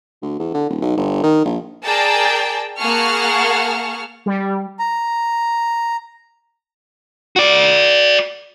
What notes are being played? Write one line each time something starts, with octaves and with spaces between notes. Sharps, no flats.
D2
E2
D3
D#1
B1
G1
D#3
A#1
G#4 A#4 D5 G5 A5
A#3 G#4 F#5 A5 C#6 F6
G3
A#5
F#4 D5